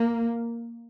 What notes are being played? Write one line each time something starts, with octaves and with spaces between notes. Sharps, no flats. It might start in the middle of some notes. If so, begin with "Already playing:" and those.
Already playing: A#3